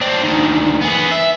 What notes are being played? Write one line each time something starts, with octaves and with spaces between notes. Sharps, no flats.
C4 D4
D2 D#3
B3 G#4
E5